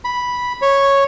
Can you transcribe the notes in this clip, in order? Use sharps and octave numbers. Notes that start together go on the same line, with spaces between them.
B5
C#5